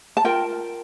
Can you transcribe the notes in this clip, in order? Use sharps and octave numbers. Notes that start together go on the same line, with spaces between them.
A5
F4 A#4 G5